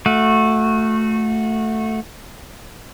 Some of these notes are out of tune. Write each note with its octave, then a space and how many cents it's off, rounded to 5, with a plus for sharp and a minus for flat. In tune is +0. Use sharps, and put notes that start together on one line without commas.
A3 +0 F#4 -20